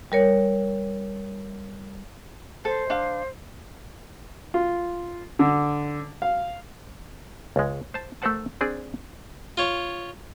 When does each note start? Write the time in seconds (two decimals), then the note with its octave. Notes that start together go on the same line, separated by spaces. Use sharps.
0.12 G3 A#4 C#5
2.65 A4 C5
2.90 D4 F5
4.54 F4
5.39 D3
6.22 F5
7.56 C#2 G#3
7.94 C5 A5
8.22 A3 A4 A#4 C5 F#5 A5
8.61 C4 D4 G#4 D5
9.57 F4 C#5